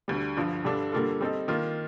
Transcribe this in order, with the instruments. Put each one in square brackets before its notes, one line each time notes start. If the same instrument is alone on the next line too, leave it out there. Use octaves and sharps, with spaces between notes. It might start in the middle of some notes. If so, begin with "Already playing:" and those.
[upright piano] D2 D3 G3
G2 D3 F3
G2 D3 G3 D4 A4
D3 G3 A#3 F4 A4
G3 C4 D#4 A4
D#3 A#3 F4